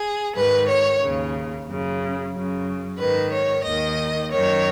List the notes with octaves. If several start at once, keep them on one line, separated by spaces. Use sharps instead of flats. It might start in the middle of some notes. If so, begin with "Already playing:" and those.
Already playing: G#4
G#2 D#3 B4
C#5
D#2 C#3
F#2 C#3
F#2 C#3
G#2 D#3 B4
C#5
D#2 D#3 D#5
F#2 D#3 C#5